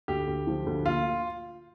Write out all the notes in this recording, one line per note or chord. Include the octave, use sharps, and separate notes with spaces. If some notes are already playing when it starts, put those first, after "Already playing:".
D2 G4
D2
F3
D2
A#2 F4